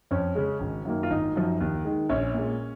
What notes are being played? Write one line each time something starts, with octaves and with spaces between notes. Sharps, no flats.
F2 C#4
C#3 G#3
G#1
F#2 D#3 A#3
F4
G#1 D#4
F#2 F3
D#2
D#3 G#3
A#1 C#4
A#2 G#3